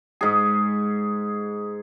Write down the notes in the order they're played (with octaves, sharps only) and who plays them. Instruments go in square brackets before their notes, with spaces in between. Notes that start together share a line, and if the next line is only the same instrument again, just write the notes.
[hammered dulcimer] G#2 G#4